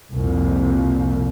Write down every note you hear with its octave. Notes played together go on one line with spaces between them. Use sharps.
C2 F2 A#2